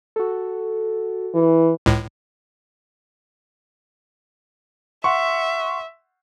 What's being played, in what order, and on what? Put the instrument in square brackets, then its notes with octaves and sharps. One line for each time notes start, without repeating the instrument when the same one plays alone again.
[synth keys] F#4 A4
[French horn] E3
[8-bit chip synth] C#2 A2
[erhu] E5 [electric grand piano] F#5 C6 C#6